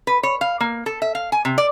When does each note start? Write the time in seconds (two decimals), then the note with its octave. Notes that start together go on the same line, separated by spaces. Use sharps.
0.07 B4
0.23 C#5
0.41 F5
0.60 A#3
0.86 A4
1.02 E5
1.15 F5
1.32 G#5
1.45 C3
1.58 D5